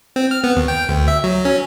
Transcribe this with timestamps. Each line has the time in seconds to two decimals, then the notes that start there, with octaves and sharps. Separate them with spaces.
0.16 C4
0.31 F6
0.44 B3
0.56 D#2
0.68 G5
0.89 D2
1.08 E5
1.24 F#3
1.45 C#4